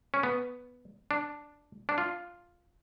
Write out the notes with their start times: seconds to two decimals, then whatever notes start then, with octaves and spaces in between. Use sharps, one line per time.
0.14 C#4
0.23 B3
1.11 D4
1.89 D4
1.98 F4